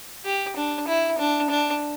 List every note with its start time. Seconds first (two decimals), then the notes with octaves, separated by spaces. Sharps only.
0.25 G4
0.57 D4
0.88 E4
1.18 D4
1.50 D4